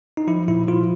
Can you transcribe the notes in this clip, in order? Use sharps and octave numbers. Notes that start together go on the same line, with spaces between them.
D#4
F3 E4
A#2 E4
F3 F4